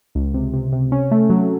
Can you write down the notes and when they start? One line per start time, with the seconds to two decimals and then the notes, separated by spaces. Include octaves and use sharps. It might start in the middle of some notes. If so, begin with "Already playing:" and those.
0.15 C#2
0.34 C3
0.54 C3
0.72 C3
0.92 C#4
1.11 A3
1.30 F#3